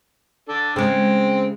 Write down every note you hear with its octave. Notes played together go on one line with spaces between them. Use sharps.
D4 A4
C#3 G#3 C4